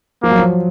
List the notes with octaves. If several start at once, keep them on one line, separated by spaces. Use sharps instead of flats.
F3 A#3
F#3
F3